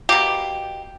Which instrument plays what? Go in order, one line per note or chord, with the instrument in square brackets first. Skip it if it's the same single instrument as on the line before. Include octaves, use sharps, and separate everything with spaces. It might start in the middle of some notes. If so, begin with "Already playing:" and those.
[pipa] B2 A#3 G4